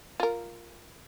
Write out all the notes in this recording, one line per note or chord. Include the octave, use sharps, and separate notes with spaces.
F4 A#4